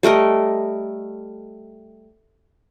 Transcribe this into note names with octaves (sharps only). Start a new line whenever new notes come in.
G3 A3 A#4 D#5